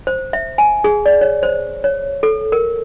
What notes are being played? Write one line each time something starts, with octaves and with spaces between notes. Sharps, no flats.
C5
E5
G#5
G#4
D5
C#5
C5
C#5
A4
A#4